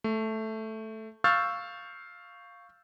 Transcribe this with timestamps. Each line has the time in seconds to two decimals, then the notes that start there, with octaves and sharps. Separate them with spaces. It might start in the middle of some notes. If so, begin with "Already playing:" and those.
0.04 A3
1.24 F5 C#6 E6 F6 G6 A6